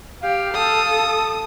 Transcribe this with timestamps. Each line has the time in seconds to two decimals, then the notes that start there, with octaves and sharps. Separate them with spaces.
0.23 G4 F5
0.54 A4 D#6